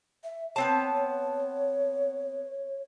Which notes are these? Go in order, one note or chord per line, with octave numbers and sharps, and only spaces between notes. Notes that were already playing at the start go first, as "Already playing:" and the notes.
E5
B3 C4 C#5 A5